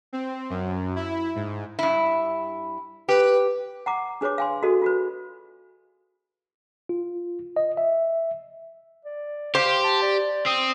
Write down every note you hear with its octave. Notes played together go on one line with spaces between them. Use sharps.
C4
F#2
E4
G#2
G2 E4
G4 B4
F#5 A#5 D6
D4 G#4 B4 C#5 D6
F5 G#5 C6
F#4 G#4 A4 D#5
F4 F#4 B4
F4
D#5
E5
D5
G4 C5 F5
A5
D5
C4 D#6